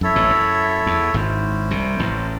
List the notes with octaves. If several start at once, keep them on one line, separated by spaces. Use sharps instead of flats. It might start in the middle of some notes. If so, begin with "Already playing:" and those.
F#2 E4 A4 C#5 E5
A1 A2
F#2
E2
G#1 G#2 C#4 E4 C5
C2 C3
A1 A2